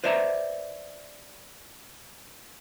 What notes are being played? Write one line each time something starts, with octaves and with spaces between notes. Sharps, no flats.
B4 C5 D5 E5 A5 A#5